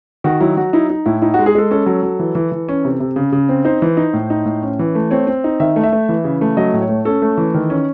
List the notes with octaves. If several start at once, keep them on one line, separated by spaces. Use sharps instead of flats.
D#3 F#4
F#3 E4
F#3 F#4
D#4 E4
D#4
A2 E4
D#4 E4
F#4
G#3
G#4
G#3 A4
C#4 A4
F#3
F#3
E3
E3
E3
C#4
C3
C3
C#3
C#3
C4
D#4 C5
E3
D#4
A2
D#4
A2
C#4
E3
A3
C4 C#5
C4
D#4
D#3 E5
A3
E5
A3
E3
C#3
A3
F#3 D#5
A2
C#5
A3
C#4 A4
A3
E3
D#3
C#4